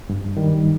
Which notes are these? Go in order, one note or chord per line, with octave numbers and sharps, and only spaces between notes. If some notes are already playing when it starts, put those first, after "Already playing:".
G2
D#3 G3